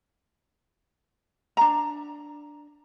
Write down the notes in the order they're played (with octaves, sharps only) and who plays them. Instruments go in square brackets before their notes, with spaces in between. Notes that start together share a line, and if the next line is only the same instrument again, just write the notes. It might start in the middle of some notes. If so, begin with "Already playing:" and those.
[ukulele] D4 A#5